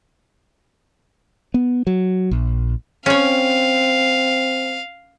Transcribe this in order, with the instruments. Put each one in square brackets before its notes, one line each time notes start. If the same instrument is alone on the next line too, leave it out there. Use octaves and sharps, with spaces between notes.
[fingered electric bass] B3
F#3
A#1
[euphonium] C4 [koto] C#4 C#5 [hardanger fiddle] F5